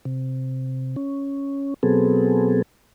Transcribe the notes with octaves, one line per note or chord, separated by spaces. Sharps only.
C3
C#4
B2 F#3 B3 C4 G#4 A4